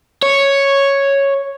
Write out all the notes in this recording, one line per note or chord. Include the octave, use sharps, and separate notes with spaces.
C#5